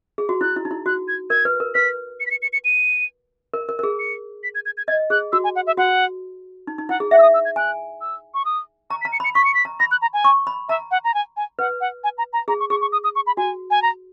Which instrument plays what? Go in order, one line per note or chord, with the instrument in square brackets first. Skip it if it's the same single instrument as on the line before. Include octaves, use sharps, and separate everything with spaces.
[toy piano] G#4
F#4
[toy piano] E4 [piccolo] F#6
[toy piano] E4
D#4
E4
[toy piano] F#4 [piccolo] F#6
[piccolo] G#6
[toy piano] A#4 [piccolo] G#6
[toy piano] B4
A#4
[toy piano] B4 [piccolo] B6
[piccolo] C#7
B6
C#7
C#7
C#7
D#7
[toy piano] A#4
A#4
A#4
G#4
[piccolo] C#7
B6
G#6
G#6
G#6
[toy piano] D#5 [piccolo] G#6
[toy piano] G#4 [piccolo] F#6
[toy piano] F#4 [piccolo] E6
[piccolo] G#5
F#5
E5
[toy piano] F#4 [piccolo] F#5
[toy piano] D#4
D#4
[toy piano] E4 [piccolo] F#5
[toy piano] G#4
[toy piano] E5 [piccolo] F#5
[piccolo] E6
D#6
E6
G#6
[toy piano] G#5 [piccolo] F#6
[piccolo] E6
C#6
D#6
[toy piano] A#5 [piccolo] C#6
[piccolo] B6
[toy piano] A#5
[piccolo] C#7
[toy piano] B5
[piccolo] C#7
[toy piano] C#6 [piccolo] B6
[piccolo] C#7
B6
[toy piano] A#5
[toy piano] B5 [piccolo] A#6
[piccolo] F#6
A#5
G#5
[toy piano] C#6
B5
[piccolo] E5 [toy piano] A#5
[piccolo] F#5
A#5
G#5
G#5
[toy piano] B4 [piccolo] F#5
[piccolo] F#5
G#5
A#5
A#5
[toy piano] G#4 [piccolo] A#5
[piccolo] C#6
[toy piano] G#4 [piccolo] C#6
[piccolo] C#6
D#6
D#6
C#6
B5
[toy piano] F#4 [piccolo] G#5
[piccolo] G#5
A#5